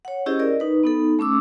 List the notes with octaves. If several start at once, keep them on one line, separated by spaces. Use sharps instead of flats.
C#5 F#5
C#4 E4 G4 G#4 C5 D#5
A#4 D5 D#5
D#4 B4
B3 D#4 A4
A3 C#4 D6 E6